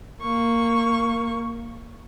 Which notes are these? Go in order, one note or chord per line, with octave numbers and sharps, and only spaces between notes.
A#3 C#6